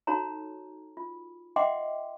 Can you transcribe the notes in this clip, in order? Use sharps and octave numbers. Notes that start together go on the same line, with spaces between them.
D#4 F#4 A4 C#5 A#5
F4
D#5 E5 F#5 G5 C6 D6